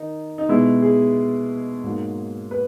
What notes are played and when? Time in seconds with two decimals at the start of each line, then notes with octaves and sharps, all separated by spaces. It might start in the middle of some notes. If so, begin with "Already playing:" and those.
Already playing: D#3 D#4
0.38 D#4
0.49 B2 G#3 B3 E4
0.82 G#4
1.84 G#2 F#3 A#3
2.51 B4